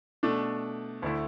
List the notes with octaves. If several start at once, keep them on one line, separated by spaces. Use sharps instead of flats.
B2 A3 D4
D2 D3 A3 E4